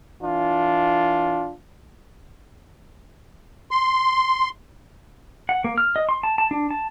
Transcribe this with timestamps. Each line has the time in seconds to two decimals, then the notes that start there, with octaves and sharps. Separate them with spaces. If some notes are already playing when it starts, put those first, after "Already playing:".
0.22 E3 D4 F4
3.71 C6
5.49 F#5
5.64 A#3
5.78 F6
5.96 D#5
6.09 C6
6.23 A5
6.38 A5
6.51 D4
6.71 A5